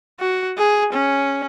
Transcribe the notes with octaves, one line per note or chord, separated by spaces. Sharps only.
F#4
G#4
C#4